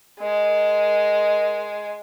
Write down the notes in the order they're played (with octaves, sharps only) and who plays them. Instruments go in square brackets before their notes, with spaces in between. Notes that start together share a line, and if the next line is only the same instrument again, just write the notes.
[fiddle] G#3 [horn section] A#4 D#5